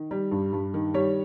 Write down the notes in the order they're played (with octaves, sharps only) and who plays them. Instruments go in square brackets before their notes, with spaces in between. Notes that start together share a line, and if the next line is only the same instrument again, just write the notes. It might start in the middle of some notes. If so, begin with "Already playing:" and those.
Already playing: [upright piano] D#3
G3
G2
G2
D#3
G3 C#5